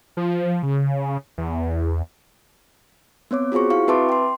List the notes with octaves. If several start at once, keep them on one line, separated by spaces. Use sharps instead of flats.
F3
C#3
E2
B3 C4 C#5 D6
F4 F#4 G#4 C5 C#6
E4 F#4 F5 C#6
C4 B4 E5 A5 C6 D6
G5 C6